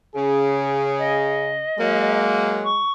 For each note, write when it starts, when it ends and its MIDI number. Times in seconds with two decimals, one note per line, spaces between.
0.16 1.63 49
0.16 1.55 68
0.98 2.20 75
1.79 2.65 54
1.79 2.84 56
1.79 2.65 58
2.63 2.92 85